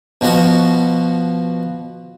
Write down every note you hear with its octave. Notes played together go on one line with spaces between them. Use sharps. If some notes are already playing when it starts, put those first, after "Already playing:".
B2 F3 B3 F#4